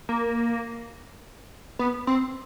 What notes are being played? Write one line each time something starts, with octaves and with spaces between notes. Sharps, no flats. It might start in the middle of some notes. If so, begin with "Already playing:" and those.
A#3
B3
C4